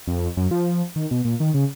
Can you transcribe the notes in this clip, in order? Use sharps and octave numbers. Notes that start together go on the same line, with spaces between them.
F2
F#2
F3
D#3
B2
A#2
D#3
C#3